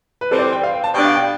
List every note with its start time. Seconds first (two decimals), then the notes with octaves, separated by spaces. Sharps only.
0.21 B4
0.31 E3 G3 C4 A4
0.39 D5
0.42 C5
0.52 G5
0.63 F5
0.74 G5
0.84 A5
0.94 B2 G3 D4 G5
1.05 F5
1.16 G5